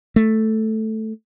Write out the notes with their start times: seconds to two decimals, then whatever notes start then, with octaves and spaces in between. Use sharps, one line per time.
0.16 A3